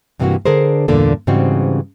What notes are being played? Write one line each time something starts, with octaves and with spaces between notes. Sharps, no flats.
G2 C3 E3 G3 A#3 F#4
D3 D4 G#4 A#4 C5
E2 G2 A#2 D3 A#3 A4
G#2 C#3 E3 G3 C4 F#4